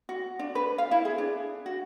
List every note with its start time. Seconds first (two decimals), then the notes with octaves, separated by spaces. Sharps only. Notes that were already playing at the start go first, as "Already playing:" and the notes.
0.09 F#4
0.39 D4
0.55 B4
0.78 F5
0.91 E4
1.05 G#4
1.18 D4
1.66 F#4